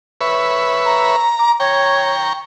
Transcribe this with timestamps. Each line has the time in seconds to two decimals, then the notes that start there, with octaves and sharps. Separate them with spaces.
0.21 B4 C#5 E5
0.85 A#5
1.39 D6
1.60 C#5 G5 A#5 C#6